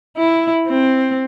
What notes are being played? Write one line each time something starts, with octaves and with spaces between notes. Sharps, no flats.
E4
C4